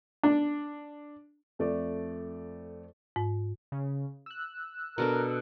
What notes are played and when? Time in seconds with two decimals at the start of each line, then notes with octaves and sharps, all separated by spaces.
0.23 D4
1.59 F2 A3 D5
3.16 G#2
3.72 C#3
4.26 E6 F#6
4.98 B2 D4 A4 A#4